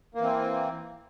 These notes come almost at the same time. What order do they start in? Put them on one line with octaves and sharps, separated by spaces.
A#3 E3 C4